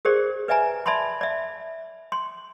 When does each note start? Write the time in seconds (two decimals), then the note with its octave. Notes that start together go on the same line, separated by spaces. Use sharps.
0.05 G4 G#4 A#4 C5 D5
0.48 B4 D5 E5 G#5 A#5
0.86 D5 E5 A5 B5 C6
1.21 D5 E5
2.12 C6